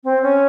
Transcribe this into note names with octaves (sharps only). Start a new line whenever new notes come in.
C4
C#4